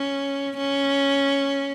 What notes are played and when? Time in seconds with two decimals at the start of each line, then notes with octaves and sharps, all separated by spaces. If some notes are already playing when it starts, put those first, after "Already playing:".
Already playing: C#4
0.57 C#4